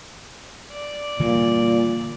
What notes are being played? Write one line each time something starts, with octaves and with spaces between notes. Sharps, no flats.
D5
A#2 D3 E3 G3